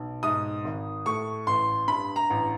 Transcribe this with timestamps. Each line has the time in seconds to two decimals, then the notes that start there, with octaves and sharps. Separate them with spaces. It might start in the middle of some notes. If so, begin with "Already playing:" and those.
Already playing: B1
0.23 G#2 D#6
0.64 G#1
1.06 A2 C#6
1.47 A1 C6
1.88 G2 B5
2.16 A#5
2.30 A1